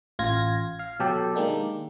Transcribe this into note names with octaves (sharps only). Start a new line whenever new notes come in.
A1 F4 G#6 A#6
F5
B2 F#3 G4 A4
D#3 G#3 A#3 D4 G4